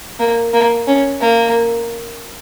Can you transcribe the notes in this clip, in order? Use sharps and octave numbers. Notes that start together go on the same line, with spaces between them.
A#3
A#3
C#4
A#3